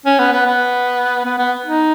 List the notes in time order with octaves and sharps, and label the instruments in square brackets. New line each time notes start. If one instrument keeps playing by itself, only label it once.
[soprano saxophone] C#4
B3
B3
B3
B3
B3
D#4